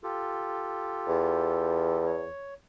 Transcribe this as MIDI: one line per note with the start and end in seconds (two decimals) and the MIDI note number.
0.03 2.04 65
0.03 2.04 67
0.03 2.04 69
1.08 2.28 40
2.06 2.54 73